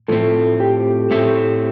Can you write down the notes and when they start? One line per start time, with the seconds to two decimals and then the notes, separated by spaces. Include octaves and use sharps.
0.08 A2 F3 A3 C4 A4
0.60 G4
1.11 A2 A3 C4